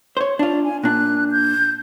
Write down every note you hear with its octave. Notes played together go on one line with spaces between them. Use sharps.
C5 C#5
D4 F4 D5
G#5
A#2 D4 F#6
G6